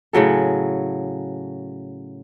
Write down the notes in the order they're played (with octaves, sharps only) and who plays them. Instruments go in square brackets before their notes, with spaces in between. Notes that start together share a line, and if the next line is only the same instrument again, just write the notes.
[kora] A2 C#3 F#3 A4